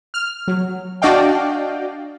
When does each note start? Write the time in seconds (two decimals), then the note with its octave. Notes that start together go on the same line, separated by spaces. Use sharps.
0.14 F6
0.48 F#3
1.02 D4 F#4 D5 D#5 F5 G5